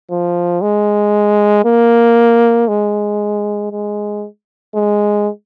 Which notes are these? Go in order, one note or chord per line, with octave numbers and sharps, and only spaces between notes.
F3
G#3
A#3
G#3
G#3
G#3